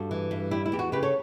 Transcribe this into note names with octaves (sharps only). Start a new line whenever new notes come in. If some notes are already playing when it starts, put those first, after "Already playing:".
Already playing: G2 F#4 A4
E3
G2
G3 E4 G4
E4
E2 G4
F#4
C#3 G4 B4
A4 C#5